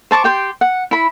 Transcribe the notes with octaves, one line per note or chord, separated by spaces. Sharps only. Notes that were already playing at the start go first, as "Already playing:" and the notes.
C5 A5 C#6 D6
G4 G5 C6
F#5
E4 B5